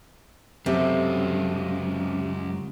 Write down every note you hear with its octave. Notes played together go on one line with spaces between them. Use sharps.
C#2 F#2 C3 A4